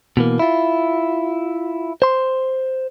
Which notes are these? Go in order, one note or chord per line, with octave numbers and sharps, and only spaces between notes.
B2 E3 A#3
E4 F4
C5 C6